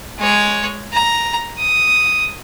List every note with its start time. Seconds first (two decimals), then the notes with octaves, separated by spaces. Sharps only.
0.19 G#3 C#5
0.93 A#5
1.58 D#6